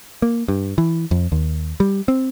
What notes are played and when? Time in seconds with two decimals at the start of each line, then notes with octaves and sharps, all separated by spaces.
0.22 A#3
0.48 G2
0.78 E3
1.11 F2
1.32 D#2
1.80 G3
2.08 C4